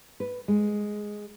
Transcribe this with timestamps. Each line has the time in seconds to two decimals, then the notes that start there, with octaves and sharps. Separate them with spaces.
0.20 B4
0.48 G#3